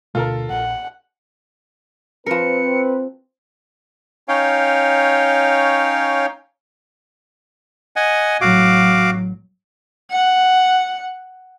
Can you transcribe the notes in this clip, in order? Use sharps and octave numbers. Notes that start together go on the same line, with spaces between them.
D2 B2 A3 F4 A4 A#4
A#1 F#5
F3 C4 A#4 B4 C#7
C#4 D#4 C#5 F5 G5
D#5 F#5 G#5
A1 F#3 F#4 F5 D6
F#5